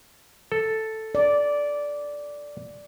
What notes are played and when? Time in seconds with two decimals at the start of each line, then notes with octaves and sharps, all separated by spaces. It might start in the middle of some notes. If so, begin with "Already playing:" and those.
0.52 A4
1.15 D5